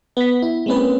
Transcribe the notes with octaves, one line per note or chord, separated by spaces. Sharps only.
B3 B6
E4
G#3 A#3 C4 C#4 B4